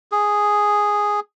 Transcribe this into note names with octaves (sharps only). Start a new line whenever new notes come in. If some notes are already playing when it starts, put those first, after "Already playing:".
G#4